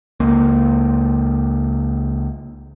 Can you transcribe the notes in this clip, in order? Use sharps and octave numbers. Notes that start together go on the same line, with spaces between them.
C#2 A#3